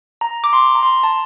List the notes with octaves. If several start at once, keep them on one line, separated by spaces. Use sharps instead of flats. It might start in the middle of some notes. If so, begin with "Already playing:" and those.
A#5
D6
C6
A#5
C6
A5